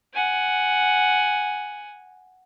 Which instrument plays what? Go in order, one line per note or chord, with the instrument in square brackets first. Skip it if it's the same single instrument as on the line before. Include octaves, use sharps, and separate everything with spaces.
[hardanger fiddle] F#5 G#5